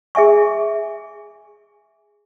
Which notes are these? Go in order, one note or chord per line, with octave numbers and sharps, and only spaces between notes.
G#4 E5 G#5 C#6